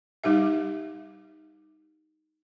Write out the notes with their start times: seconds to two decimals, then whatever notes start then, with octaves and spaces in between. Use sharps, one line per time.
0.24 G3 D#4 G4 E5